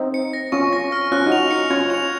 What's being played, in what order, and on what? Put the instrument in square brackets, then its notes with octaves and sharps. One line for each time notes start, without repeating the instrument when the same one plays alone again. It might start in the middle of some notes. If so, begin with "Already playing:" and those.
Already playing: [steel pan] C4 D#4
[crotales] C#7
A#6
[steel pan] C#4 F4 [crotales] C#6
[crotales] A#6
F6
[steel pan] C#4 F4 [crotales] F#6
[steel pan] D#4 F#4
[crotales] F7
C#7
[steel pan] C#4 F4 [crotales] G#6
[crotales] F7